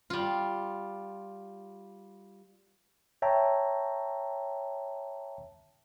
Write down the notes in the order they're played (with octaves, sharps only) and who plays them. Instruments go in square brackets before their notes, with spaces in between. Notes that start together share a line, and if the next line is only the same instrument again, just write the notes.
[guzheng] G3 F4
[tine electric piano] C#5 E5 G5 A5 A#5